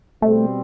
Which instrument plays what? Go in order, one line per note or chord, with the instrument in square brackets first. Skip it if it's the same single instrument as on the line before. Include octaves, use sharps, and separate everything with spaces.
[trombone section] B2 G3 C4 [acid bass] A3